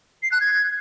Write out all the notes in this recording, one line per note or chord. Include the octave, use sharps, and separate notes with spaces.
C7
F#6
G#6